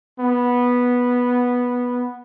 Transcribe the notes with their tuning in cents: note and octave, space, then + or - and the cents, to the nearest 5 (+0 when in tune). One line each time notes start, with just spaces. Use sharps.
B3 -10